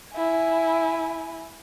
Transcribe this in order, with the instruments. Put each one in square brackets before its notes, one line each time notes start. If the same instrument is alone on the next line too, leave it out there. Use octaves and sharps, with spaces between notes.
[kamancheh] E4 G#5